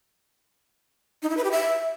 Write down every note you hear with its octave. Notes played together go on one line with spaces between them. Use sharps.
D#4
E4
B4
G4
E5